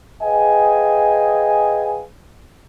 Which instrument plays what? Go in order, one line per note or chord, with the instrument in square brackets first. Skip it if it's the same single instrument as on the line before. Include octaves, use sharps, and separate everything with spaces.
[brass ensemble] G#4 B4 D#5 F5 G5 G#5